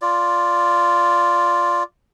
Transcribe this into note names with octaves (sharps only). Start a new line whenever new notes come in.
F4 D5